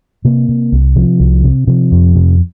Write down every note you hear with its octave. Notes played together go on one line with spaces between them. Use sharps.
C3 A#3
C3
C2
C3 F3
C2
C3
C3 F3
F2
C3